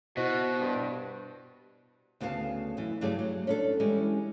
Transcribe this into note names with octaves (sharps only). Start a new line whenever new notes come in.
B2 E4 F#4 C5 D#5
G2
D2 C#3 B3 F#4 F5 A5
F#2 E3
G2 C#3 F#3 A3 G#4 D5
F#3
C#4 D4 A4
E3 G3 G#3 C#4